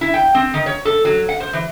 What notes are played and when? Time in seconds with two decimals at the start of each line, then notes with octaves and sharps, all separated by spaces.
0.01 E4
0.14 G5
0.35 C4
0.54 D#3
0.66 C#5
0.85 A4
1.05 F#3
1.29 F#5
1.40 C5
1.53 E3